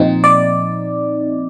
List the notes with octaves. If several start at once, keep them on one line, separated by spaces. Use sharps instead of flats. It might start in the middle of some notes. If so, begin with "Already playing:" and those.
Already playing: A#2 F3 C4 D#4
D5